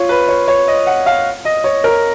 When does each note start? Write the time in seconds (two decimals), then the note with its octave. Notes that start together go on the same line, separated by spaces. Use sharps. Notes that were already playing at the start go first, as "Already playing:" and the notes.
Already playing: F4 C#5
0.09 B4
0.28 C#5
0.48 C#5
0.68 D#5
0.87 F#5
1.06 F5
1.45 D#5
1.64 C#5
1.84 A#4